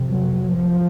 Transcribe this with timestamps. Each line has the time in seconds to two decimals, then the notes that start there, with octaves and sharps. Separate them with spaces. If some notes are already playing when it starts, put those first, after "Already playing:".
Already playing: F2 C3
0.11 F#3
0.55 F3